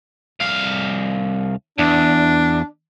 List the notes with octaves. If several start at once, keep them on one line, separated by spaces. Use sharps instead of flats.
C2 F5
E2 D4